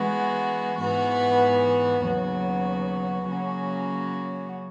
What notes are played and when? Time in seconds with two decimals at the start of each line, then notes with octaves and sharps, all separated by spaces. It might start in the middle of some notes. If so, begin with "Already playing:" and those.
Already playing: E3 G#3 B3 F#4
0.80 G#2 E3 B3 F#4
2.05 D#2 C#3 F#3 B3 F#4
3.29 C#3 F#3 A#3 C#4 F#4